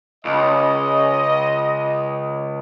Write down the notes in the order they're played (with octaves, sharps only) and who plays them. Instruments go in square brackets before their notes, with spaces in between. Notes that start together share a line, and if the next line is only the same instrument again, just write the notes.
[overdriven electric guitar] C#2 [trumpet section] D#5